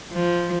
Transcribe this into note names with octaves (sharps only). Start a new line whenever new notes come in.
F3